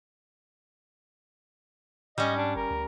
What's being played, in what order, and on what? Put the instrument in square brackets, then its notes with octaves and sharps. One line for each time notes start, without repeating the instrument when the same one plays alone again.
[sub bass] G#2 [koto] G3 C#4 [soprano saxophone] D#5
[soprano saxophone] D4
[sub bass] G1 [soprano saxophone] A#4
[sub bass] D2